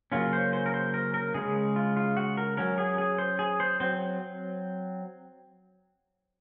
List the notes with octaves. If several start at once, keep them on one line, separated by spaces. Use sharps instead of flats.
C#3 F#3 A#3 C#4 F4
C5
C5
A#4
C5
A#4
A#4
C#3 G#3 C#4 G#4
F4
F4
F#4
A#4
F#3 C#4 A#4
G#4
G#4
C5
G#4
C5
F#3 C4 C5